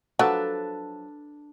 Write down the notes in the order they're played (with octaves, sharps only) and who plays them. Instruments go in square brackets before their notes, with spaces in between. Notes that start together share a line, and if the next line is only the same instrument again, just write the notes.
[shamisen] F3 F#3 [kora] D4 A4 B4